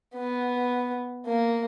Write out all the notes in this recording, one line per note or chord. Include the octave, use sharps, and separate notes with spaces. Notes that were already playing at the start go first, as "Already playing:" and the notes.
B3
A#3